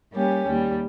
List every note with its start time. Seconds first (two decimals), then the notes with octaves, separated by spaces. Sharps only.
0.13 G3 A#3 C#4 G4
0.47 D#2 G3